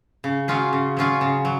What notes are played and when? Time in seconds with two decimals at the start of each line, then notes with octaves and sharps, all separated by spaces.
0.24 C#3
0.48 F#3 C#4 F4 G#4
0.73 C#3
0.97 F#3 C#4 F4 G#4
1.21 C#3
1.45 F#3